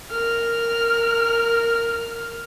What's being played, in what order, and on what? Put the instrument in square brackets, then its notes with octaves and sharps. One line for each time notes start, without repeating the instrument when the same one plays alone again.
[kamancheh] A#4 F6